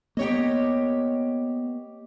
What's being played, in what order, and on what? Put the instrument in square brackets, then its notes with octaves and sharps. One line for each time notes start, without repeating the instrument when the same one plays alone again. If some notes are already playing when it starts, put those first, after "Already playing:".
[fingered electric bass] A#3 B3 [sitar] G4 C#5 D#5